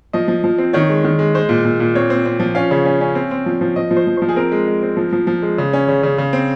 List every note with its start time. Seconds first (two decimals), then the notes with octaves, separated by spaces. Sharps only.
0.13 F3 D#5
0.28 F3
0.44 F3
0.58 C4
0.73 D#3 C#5
0.89 G#3
1.04 D#3
1.19 G#3
1.34 G#3 C5
1.49 A#2
1.65 A#2
1.80 A#2
1.95 C4 C#5
2.10 C4
2.26 C4
2.40 F3
2.55 C#4 F5
2.71 C#3
2.85 C#4
3.01 C#4
3.15 C4
3.31 C4
3.46 F3
3.61 F3
3.76 F3 D#5
3.91 F3
3.97 C5
4.07 F3
4.17 F3 C5
4.29 G#4
4.36 C4 A#4
4.52 G#3
4.67 G#3
4.83 C4
4.97 F3
5.13 F3
5.27 F3
5.42 G#3
5.58 C#3
5.73 C#4
5.88 C#3
6.03 C#3
6.18 C#3
6.33 C4